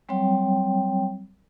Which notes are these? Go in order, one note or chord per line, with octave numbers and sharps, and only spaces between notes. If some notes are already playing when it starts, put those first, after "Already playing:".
F#3 G3 C4 C#5 G5